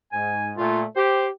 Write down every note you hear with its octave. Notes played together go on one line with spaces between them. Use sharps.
G#2 G#5
A#2 A3 F4
G4 C5